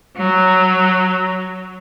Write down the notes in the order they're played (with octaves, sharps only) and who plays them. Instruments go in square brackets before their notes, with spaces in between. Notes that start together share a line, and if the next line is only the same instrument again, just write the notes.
[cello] F#3